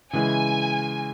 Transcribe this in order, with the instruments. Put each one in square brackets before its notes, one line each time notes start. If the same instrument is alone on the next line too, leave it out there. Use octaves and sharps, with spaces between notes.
[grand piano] C#3 E3 G#3 E4 [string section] G#5